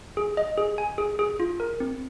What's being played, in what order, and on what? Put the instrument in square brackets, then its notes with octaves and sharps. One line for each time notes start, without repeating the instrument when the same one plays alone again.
[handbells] G#4
D#5
G#4
G#5
G#4
G#4
F4
A#4
C4